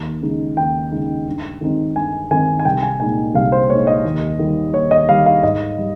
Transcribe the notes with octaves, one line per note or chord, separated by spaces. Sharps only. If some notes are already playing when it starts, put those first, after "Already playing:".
Already playing: D#2
C#3 G#3 D#4
D#2 G5
C#3 G#3 D#4
G2
D#3 G#3 C4 D#4
G2 G#5
D#3 G#3 C4 D#4 G#5
G#5
C2 G5
G#5
A#2 G#3 D#4 G#5
C2 F5
C5
A#2 G#3 D#4 C#5
D#5
D#2
D#3 G3
D#2 C#5
D#5
D#3 G3 F5
F5
G#2 D#5
G3